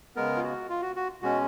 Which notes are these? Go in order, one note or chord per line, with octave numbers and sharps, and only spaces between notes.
C#3 G#3 B3 A#4
F4
F#4
F4
F#4
F#4
B2 G#3 C#4 F#4